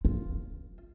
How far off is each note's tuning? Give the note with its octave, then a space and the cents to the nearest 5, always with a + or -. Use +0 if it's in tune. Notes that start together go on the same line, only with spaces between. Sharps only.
F4 +0